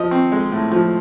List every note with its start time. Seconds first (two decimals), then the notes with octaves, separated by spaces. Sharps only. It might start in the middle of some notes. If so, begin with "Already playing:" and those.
Already playing: F3 D#5
0.11 C4
0.32 G#3
0.52 A2
0.72 F3